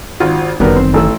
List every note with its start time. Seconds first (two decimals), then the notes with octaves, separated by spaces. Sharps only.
0.20 G#1 F4 F#4
0.60 G1 F#2 D#3 F#3 G3 B3 A#4
0.76 C4 C5 C6
0.94 A1 A4 E6